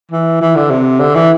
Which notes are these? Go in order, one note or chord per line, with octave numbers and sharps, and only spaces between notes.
E3
E3
D3
C3
D3
E3